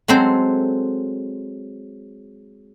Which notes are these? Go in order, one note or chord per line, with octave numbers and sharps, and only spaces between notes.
F#3 G#3 C4 A4 C5